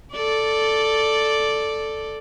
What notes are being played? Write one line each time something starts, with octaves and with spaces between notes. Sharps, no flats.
A4 D5